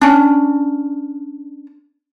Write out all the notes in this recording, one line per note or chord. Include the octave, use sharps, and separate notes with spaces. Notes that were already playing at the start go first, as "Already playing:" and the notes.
C#4 D4